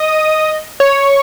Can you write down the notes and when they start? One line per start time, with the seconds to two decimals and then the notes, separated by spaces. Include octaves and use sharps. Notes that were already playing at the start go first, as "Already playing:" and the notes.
Already playing: D#5
0.80 C#5